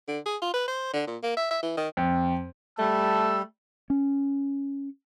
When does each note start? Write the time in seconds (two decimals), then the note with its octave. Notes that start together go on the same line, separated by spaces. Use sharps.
0.08 D3
0.26 G#4
0.42 F4
0.54 B4
0.68 C5
0.93 D3
1.07 A#2
1.23 A#3
1.37 E5
1.51 E5
1.63 E3
1.77 D#3
1.97 F2
2.79 G3 A3 A5 E6
3.90 C#4